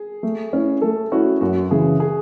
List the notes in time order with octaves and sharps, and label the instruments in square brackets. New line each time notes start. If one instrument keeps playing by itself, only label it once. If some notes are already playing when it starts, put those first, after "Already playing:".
Already playing: [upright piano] G#4
[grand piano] A3
C#4 E4
[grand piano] A3 [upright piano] A4
[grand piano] C#4 E4 [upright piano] F#4
[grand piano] F#2 [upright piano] F#4
[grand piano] C#3 E3 [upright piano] G#4
[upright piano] G#4